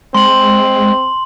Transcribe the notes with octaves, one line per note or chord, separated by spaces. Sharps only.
G#3 C4 C6 F#7